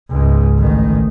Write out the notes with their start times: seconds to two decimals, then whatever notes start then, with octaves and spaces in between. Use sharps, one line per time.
0.10 C#2 G#2
0.58 A1 D#3